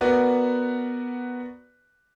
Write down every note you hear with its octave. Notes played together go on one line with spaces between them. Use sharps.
B3 F#4 A#4 B4 D5